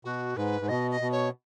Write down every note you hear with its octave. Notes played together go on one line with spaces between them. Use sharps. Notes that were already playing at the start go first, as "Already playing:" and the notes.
B2 F#4
G#2 B4
G#2
B2 D#5
D#5
B2
C#5